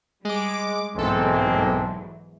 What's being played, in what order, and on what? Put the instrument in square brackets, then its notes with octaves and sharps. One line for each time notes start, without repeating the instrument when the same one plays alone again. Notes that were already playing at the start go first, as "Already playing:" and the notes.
[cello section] G3 [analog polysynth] G#3 D6
[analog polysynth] B1 A4 [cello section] E2 G#2 F#3 [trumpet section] G#3 A#3 C4